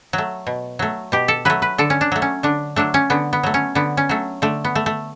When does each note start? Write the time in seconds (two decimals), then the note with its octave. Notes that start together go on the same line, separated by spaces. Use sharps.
0.13 F#3
0.18 A3
0.47 B2
0.79 F#3 A3
1.12 B2 G4
1.28 A4
1.45 F#3 A3 B4
1.62 B4
1.78 D3 A4
1.90 C#4
2.01 D4
2.12 F#3 A3
2.22 C#4
2.43 D3 D4
2.76 F#3 A3 D4
2.94 C#4
3.10 D3 B3
3.33 B3
3.43 F#3 A3
3.54 C#4
3.75 D3 B3
3.97 C#4
4.09 F#3 A3
4.42 D3 A3
4.64 B3
4.75 A3
4.86 A3